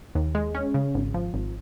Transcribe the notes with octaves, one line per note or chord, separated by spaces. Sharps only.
D#2
G#3
C#4
C#3
G#1
F3
G#1